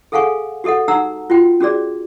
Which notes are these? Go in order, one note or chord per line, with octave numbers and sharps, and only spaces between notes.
G#4 A4 F5 F#5 G#5 C#6
F#4 G4 A4 D#5 F#5
D#4 G4 F#5 A#5 E6
F4 F#4 G5
C#4 F#4 G#4 D5